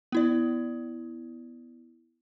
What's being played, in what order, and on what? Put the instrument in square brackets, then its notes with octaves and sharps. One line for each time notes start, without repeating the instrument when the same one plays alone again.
[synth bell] B3 E4 D5